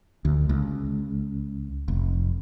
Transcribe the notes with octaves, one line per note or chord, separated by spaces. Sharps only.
D2
C#2
F1